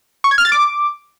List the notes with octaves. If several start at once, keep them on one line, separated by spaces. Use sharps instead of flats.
C#6
G#6
F6
A6
D6